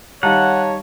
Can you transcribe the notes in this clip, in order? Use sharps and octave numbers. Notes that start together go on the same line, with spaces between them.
D#3 G3 C#5 F5 F#5 A5 A#5